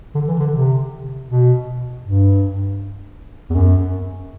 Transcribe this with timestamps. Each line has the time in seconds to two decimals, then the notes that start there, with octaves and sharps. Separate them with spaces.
0.14 D3
0.28 E3
0.40 D3
0.53 C3
1.28 B2
2.04 G2
3.50 E2
3.55 F#2